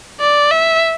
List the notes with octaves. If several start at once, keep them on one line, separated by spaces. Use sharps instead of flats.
D5
E5